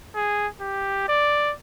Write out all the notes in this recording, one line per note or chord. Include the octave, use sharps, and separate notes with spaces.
G#4
G4
D5